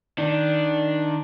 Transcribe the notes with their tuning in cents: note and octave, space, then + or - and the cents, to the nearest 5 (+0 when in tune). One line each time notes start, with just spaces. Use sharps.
D#3 +0 D4 +0